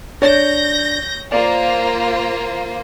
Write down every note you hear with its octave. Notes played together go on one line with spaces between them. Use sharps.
D4 C#5 G6 A#6
A#3 F4 C5 D5